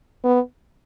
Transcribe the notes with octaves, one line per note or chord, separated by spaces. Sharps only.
B3